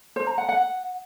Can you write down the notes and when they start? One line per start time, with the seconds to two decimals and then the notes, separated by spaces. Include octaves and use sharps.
0.16 C5
0.27 A#5
0.38 F#5
0.49 F#5